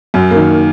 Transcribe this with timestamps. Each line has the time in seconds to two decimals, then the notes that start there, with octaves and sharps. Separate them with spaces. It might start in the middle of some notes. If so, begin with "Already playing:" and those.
0.14 F#2
0.31 D#3 A#3